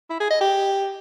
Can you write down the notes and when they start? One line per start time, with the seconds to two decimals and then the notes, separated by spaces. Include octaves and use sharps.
0.10 E4
0.20 G#4
0.31 D#5
0.41 G4